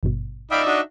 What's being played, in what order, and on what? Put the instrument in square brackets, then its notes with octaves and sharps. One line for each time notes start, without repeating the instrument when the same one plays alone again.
[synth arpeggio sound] G#1 G2 B2
[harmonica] D#4 D5 E5 [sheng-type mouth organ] F5 G5 B5
[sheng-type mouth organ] D4 F#4 D#5